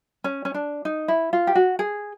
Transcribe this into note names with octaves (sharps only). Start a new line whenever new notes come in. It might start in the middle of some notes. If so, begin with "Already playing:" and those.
C#4
C#4
D4
D#4
E4
F4
G4
F#4
G#4